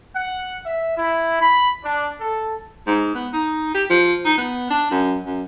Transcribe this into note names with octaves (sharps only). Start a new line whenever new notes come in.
F#5
E5
E4
B5
D4
A4
G#2
B3
D#4
G4
F3
D#4
B3
D4
F#2
F#2